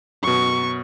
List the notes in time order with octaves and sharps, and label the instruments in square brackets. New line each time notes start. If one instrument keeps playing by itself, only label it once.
[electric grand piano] F#2 B2 [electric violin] C#6